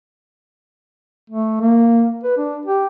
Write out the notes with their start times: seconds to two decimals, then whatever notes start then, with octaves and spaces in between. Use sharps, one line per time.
1.30 A3
1.61 A#3
2.23 B4
2.38 D4
2.66 G4